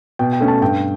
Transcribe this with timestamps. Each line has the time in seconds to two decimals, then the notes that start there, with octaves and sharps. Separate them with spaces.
0.19 B2 G5
0.33 G5
0.41 A3 C#4
0.48 A5
0.61 G2 G5